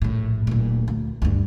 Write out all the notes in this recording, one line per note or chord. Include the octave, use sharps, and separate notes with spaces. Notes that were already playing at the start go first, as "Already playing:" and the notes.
A#1 A2
D1 A#2
D2
D2 G2